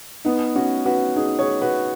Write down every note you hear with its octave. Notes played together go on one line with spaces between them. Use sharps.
B3 D#4
C#4 F#4
F#4 B4
D#4 G#4
G#4 C#5
F#4 B4